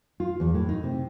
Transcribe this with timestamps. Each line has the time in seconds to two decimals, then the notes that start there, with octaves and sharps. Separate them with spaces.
0.20 F4
0.40 E2
0.54 A2
0.69 D#4
0.83 C3